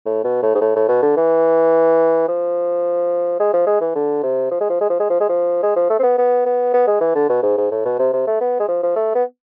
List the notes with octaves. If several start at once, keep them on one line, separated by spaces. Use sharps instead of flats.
A2
B2
A2
G#2
A2
A2
B2
D3
E3
F3
G#3
F3
G#3
E3
D3
C3
F3
G#3
F3
G#3
F3
G#3
F3
G#3
F3
G#3
F3
A3
C4
B3
B3
B3
B3
G#3
E3
D3
B2
G#2
G#2
A2
B2
C3
C3
A3
B3
G#3
F3
F3
A3
B3